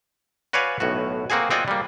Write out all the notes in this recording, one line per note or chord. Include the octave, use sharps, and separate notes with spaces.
F#4 B4 C#5 D5 F5 G#5
B1 A2 F#4
A#3 C4 F#4 G#4 G#5
C4 F4 D5 D#5 F#5 G#5
G3 A#3